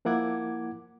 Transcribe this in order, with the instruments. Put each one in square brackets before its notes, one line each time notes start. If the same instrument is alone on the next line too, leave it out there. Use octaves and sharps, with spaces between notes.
[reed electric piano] F3 A#3 E4 F#5 D6 G#6